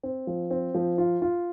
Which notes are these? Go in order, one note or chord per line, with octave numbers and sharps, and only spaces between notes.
C4
F3
C4
F3
F4
F4